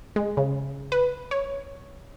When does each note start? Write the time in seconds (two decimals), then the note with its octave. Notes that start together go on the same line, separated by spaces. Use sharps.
0.16 G#3
0.37 C#3
0.92 B4
1.31 C#5